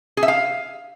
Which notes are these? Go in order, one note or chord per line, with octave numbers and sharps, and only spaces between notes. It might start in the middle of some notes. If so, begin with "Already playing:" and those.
G#4
E5
F5